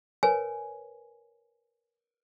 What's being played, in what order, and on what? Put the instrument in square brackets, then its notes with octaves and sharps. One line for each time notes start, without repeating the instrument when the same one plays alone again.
[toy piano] A#4 B4 C#5 G#5